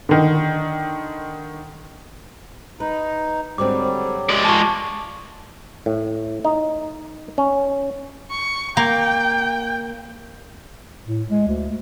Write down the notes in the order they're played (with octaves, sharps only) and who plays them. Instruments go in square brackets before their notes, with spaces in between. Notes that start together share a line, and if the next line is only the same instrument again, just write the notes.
[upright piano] D3 D#3
[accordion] D#4 [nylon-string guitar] B4
[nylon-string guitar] G#2 D3 C4 [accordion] F#3 G3 [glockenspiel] D6
[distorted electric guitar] G#3 D5
[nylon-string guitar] F4 D#5 G#5 [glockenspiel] A5 C#6
[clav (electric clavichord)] A2
D#4
C#4
[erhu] C#6
[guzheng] A#3 [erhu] G5
[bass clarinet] A2
G#3
D2